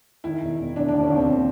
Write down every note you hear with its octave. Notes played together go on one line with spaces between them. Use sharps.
D#3 E4
E1
E1
E1 D4
D4
D#2
C#4
D#2 C4